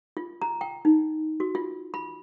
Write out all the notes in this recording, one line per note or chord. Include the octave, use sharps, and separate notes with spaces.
F4
A#5
G5
D#4
F#4
F4
B5